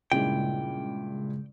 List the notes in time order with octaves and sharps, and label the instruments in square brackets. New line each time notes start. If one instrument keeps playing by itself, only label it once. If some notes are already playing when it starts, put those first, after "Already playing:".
[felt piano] G2 A#2 E4 [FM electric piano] C#3 G#3 [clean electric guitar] G5